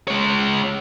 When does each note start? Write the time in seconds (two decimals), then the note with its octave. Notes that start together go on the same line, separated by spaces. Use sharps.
0.08 G#3 C#5